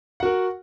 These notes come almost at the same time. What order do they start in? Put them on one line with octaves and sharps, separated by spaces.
F#5 F#4 A#4